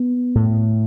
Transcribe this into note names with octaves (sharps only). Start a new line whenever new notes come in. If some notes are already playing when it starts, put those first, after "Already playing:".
Already playing: B3
A2